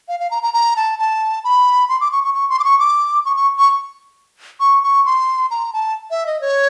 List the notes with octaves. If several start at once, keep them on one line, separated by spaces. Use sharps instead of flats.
F5
F5
A#5
A#5
A#5
A5
A5
B5
C6
D6
C#6
C#6
C#6
C6
D6
C#6
D6
C#6
C#6
C#6
C#6
C#6
C6
A#5
A5
E5
D#5
C#5